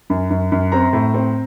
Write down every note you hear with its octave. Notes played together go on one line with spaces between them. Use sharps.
F#2
F#2
F#2
C4 A#5
A2
C4